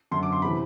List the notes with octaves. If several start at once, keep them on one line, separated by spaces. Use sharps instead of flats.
F#2 D3 C6
D6
C6
C3 E3 B5